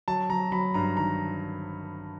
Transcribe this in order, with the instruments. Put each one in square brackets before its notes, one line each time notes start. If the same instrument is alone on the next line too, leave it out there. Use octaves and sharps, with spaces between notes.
[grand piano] F#3 A5
F#3 A#5
F#3 B5
G2 A#5
D#3 A#5